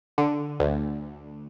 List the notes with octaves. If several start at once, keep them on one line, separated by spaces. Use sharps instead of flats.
D3
D2